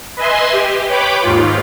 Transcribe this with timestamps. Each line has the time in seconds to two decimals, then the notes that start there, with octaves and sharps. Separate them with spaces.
0.17 B4 D#5 E5 G#5 C6
0.52 G4
0.89 B4 C#5 G5 B5 D6
1.22 D#2 G#2 F4